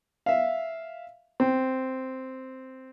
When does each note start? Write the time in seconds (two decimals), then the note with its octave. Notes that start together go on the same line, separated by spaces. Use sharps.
0.26 E5 F5
1.40 C4